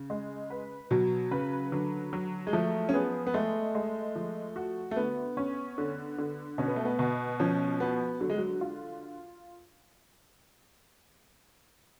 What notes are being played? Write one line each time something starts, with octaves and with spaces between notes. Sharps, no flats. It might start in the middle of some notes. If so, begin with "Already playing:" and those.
Already playing: C#3
G#3
B4
B2 F#3
C#3 B4
D3 F#3
F#3
G#3
F3 A3
C#4
B3 G#4
B3
G#3 A3
G#3
F3
F#4
A3
D3 B3
C#4
D3
D3
B2 C#4
B3
A3
B3
B2
F3 C#4
B3 F#4
D3 F#3
G#3
F#3
F4